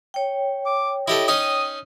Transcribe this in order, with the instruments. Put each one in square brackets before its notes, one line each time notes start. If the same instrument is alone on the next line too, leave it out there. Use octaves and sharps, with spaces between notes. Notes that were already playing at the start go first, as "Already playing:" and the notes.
[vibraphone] C#5 G5
[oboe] D6
[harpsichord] E4 G4 A4 [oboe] D#5
[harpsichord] C#4 D#4 D#5 [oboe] D#6